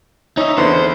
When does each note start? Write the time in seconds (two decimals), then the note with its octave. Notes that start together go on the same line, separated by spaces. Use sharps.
0.37 C#4 D#4 E5
0.58 E2 D3 B3 C5